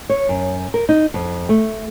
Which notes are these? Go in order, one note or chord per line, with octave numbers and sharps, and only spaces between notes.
C#5
F#2
A#4
D#4
F2
A3